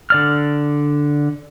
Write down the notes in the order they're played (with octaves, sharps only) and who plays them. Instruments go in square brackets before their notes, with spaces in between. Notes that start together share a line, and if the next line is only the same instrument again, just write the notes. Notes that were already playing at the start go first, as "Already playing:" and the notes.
[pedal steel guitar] D3 D5 F6